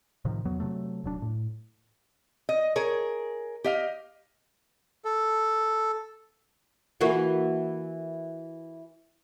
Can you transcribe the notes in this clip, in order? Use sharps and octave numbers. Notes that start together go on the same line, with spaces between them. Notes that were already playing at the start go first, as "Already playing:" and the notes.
A2 C3 D#3 F3
E2 F#3 B3
C3 F#3 A3
D#1 F#3 D4
A2
D#5
G#4 A#4 C#5
G4 D#5 F5
A4
E3 A#3 F#4